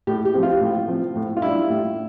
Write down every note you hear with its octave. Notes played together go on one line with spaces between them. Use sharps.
A2 G4
G4
F3 C4
F4
A2
F3 C4
A2
F4
G3 D4 E4
A2